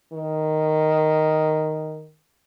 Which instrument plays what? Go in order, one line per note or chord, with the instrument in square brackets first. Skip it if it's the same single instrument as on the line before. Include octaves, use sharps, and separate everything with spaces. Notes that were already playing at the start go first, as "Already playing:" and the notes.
[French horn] D#3